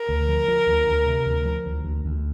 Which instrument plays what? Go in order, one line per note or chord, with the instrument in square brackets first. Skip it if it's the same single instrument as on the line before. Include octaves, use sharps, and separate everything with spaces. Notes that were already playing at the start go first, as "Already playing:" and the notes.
Already playing: [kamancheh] A#4
[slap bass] D2
F3
F3
D2
D2
C3
D2
F3
D2
D2
D2